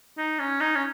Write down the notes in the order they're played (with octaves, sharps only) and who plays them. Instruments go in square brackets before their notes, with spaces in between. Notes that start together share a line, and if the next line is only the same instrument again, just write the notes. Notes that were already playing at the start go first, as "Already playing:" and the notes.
[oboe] D#4
C#4
D#4
C#4